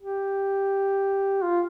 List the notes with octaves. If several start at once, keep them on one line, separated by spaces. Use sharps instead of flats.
G4
F4